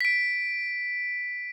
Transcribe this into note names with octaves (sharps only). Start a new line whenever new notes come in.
B6 D7